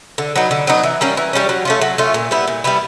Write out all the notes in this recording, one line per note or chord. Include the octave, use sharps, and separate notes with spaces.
D3
F#3 B3 D#4
D3
F#3 B3 D#4
E3
G3 A#3 C#4
E3
G3 A#3 C#4
F#3
A3 C#4 F4
F#3
A3 C#4 F4
A#2
G3 B3 E4
A#2
G3 B3 E4